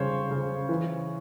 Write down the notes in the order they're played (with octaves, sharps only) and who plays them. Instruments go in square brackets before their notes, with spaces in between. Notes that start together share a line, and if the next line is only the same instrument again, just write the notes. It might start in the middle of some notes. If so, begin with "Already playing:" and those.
Already playing: [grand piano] C#3 G3 C5 C#5
C#3
E3